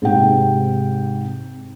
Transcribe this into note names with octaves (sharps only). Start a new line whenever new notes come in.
G#2 C3 G5